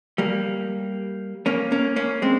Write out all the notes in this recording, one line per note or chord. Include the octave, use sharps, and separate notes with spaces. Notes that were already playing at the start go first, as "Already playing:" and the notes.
G3 A#3
A#3 C#4
A#3 C#4
A#3 C#4
G#3 C4